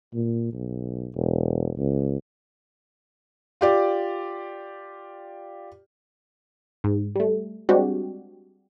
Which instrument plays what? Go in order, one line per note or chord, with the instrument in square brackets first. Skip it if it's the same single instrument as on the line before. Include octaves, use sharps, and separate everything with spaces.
[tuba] A#2
B1
E1
C#2
[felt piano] F4 G4 D5
[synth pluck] G#2
G3 A3
G3 G#3 C4 D4 F#4 G4